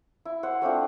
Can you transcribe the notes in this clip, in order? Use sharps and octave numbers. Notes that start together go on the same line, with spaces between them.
E4
C5 F#5
A3 C4 D4 F4